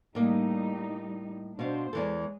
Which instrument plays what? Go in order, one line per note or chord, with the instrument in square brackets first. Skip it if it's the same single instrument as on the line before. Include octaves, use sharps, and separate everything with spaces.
[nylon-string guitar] A2 A#3 [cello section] G3 D#4
[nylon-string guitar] B2 F5 [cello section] D4 C5
[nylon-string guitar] E2 E3 A4 [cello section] G#3